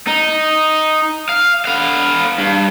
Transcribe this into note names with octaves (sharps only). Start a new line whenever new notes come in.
D#4
F5
B3 F5
G2